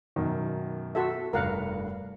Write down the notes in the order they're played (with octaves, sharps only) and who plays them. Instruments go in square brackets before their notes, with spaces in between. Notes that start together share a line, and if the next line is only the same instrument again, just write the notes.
[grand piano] F#2 B2 D#3
[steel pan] F#4 A4 E5
[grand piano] F1 G2 [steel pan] A#4 F5 F#5